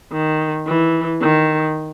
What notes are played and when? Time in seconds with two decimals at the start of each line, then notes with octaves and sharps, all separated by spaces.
0.12 D#3
0.67 E3
1.21 D#3